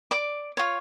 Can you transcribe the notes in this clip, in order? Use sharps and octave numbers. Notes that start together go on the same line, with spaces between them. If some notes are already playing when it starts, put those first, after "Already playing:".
D5 D6
F4 C#5